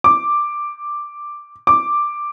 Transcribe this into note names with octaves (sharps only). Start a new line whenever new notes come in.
D6
D6